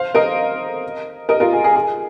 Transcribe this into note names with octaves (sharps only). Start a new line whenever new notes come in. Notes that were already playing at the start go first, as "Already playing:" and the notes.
Already playing: C5 F5
A#4 D#5
A#4 D#5
F4 A#4
G#4
G#4
G#4